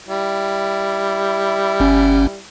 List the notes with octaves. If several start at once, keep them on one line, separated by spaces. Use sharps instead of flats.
G3 E4
G1 C#4